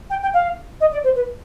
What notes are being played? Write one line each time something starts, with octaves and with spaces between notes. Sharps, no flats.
G5
G5
F5
D#5
D5
C5
B4